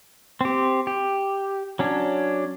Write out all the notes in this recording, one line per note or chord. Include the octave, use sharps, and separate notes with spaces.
C4 G4
G4
F#3 C#4 D4